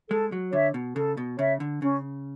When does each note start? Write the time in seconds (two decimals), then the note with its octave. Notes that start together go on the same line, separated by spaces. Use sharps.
0.10 G#3 A4
0.32 F#3
0.53 D3 C#5 E5
0.74 B2
0.96 C#3 A4
1.17 B2
1.39 C#3 C#5 E5
1.60 D3
1.82 C#3 C#4